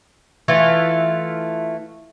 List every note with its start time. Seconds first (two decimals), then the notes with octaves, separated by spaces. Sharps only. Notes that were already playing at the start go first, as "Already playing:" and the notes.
0.48 E3 A3 F4